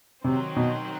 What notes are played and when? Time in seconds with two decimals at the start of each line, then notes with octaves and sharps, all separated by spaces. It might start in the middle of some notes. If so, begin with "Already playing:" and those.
0.24 C3 D#3 F#3 C4
0.56 B2